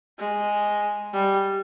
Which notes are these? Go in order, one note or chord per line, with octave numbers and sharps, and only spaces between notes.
G#3
G3